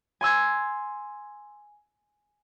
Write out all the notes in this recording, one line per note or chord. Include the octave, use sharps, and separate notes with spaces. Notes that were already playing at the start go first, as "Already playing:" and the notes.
G#5 C6 E6 G#6